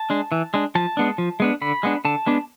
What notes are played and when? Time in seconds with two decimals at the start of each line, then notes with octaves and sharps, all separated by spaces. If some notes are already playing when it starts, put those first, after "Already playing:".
Already playing: A5
0.10 G#3 D4
0.32 E3
0.54 G#3 D4
0.75 F3 A5
0.97 G#3 B3 D4
1.18 F3
1.40 G#3 B3 D4
1.62 D3 B5
1.83 G#3 B3 D4
2.05 D3 A5
2.26 G#3 B3 D4